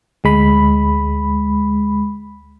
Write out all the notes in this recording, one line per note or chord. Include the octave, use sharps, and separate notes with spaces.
D2 G#3 B5